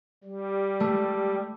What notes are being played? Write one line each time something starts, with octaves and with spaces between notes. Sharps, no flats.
G3
A3